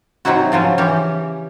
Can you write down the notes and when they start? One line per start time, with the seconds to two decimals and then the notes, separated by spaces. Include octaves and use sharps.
0.25 C3 F#3 D#4 E4 F#4
0.52 C#3 F3 F#3 C#4
0.78 E3 C#4 G4